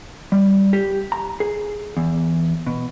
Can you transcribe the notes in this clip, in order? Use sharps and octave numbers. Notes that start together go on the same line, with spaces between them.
G3
G4
A#5
G#4
E2
B2